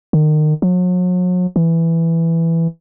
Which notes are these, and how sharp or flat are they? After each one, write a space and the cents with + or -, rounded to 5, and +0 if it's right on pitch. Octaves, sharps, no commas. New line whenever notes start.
D#3 -30
F#3 -40
E3 +5